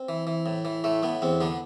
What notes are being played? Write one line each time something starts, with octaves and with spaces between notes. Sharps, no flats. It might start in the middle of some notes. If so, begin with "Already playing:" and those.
Already playing: C4
E3
E3
A2
E3
A2 A3
A2 B3
E2 C4
D3 B3